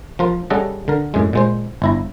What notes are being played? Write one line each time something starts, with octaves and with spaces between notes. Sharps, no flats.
F3 F4 A#4
G3 C#4 G#4 A4 D#5 F#5
D3 A#4
F#2 A2 G#3
A#2 G#3 C5
G1 E4 A#5